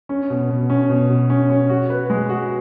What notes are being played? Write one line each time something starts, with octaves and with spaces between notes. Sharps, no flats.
C#4
B2
B2
C#4
B2
B2
C#4
C#4
F#4
B4
G#3
F#4